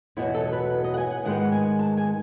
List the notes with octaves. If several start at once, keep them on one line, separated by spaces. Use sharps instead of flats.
E2 B2 F#3 E4
A4
B4
B4
D#5
F#5
G#5
F#5
G#2 D#3 G#3 B3 F#5
G#5
A5
G#5